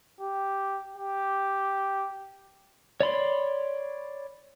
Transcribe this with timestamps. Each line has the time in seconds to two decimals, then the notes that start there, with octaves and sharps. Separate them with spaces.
0.21 G4
0.96 G4
3.01 C#5 D5 B5 C6